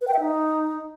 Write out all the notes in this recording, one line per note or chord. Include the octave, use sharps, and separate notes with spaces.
B4
G5
E5
D#4